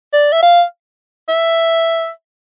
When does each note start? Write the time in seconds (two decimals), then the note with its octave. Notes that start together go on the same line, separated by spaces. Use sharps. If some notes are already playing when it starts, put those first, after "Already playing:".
0.13 D5
0.32 E5
0.42 F5
1.29 E5